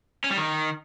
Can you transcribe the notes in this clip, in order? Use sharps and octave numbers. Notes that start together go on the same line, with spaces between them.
C#4
G3
D#3